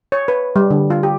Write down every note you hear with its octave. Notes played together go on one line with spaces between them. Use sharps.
C#5
B4
G3
D3
F4
G4